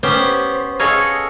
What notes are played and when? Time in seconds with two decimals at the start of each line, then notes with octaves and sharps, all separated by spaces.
0.03 B3 C#4 G4 C5
0.79 F4 G#4 A4 C#5 D#5